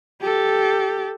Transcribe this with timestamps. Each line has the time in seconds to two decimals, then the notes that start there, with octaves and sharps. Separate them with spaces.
0.21 G4 A4